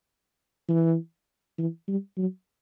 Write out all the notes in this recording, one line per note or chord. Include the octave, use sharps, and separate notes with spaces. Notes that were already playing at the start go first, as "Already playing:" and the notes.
E3
E3
G3
F#3